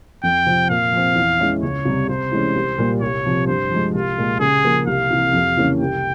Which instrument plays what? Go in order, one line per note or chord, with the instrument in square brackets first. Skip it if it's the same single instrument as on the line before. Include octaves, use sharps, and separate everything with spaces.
[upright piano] F2 [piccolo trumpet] G5
[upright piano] C3 F3 C4
[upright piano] A#2 [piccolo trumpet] F5
[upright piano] F3 C4
E2
E3 G#3 C#4 E4
[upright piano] C#2 [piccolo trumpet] C#5
[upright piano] C3 G3
[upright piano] C3 [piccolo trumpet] C5
[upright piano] E3 G#3 C#4
C2
A#2 G3
[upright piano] C2 [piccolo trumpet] C#5
[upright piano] C3 F3
[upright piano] G2 [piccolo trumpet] C5
[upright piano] F3 G#3
[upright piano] C2 [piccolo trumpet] F4
[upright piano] A#2 G#3
[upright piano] C#3 [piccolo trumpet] G#4
[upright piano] F3 A#3
[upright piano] C2 [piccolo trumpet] F5
[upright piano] C3 E3
F2
C#3 E3 A#3 C#4
[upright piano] C2 [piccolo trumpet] G5